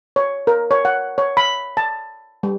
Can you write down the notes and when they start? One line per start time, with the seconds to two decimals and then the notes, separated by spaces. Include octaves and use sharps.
0.16 C#5
0.47 A#4
0.71 C#5
0.85 F#5
1.18 C#5
1.37 B5
1.77 A5
2.43 G3